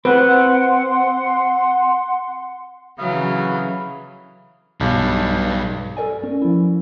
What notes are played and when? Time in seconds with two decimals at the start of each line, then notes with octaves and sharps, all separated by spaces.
0.05 C4 B4 F#5 C6
2.99 C#3 E3 F#3 F5 B5 D#6
4.80 B1 G2
5.97 A4 A#4 D5 G#5
6.24 C#4
6.42 F3 E4